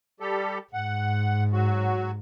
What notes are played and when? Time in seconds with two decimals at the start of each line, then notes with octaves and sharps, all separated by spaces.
0.20 G3 G4 A4
0.73 G#2 F#5
1.53 F#3 F#4